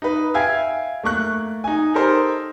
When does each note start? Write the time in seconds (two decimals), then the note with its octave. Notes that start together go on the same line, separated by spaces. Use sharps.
0.02 D#4 B4
0.34 E5 F5 G5 G#5 G#6 C7
1.03 A3 A#3 C#6 F#6
1.64 D#4 G#5
1.94 D#4 G4 A4 A#4 C5